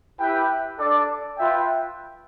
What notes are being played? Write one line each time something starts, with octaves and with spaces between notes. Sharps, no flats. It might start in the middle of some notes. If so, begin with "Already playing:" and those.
E4 G4 B4 E5 G5
D4 A4 D5
F4 B4 E5 G5